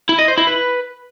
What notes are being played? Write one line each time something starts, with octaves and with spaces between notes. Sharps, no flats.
E4
D#5
C5
E4
B4